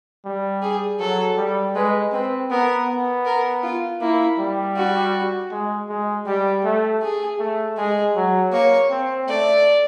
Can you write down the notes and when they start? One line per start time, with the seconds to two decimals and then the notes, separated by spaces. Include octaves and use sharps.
0.25 G3
0.62 G#4
0.99 F#3 A4
1.37 G3
1.75 G#3 B4
2.12 C4 B4
2.51 B3 A#4
2.88 B3
3.25 A#4
3.63 F4
4.01 A#3 E4
4.39 G3
4.76 F#4
5.51 G#3
5.89 G#3
6.26 G3 G4
6.64 A3
7.02 G#4
7.39 A3
7.77 G#3 G#4
8.15 F#3
8.52 A#3 C#5
8.90 C4
9.28 A3 D5